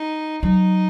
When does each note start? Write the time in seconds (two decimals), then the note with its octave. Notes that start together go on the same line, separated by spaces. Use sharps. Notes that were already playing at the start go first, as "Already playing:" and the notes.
Already playing: D#4
0.43 F#3 D#4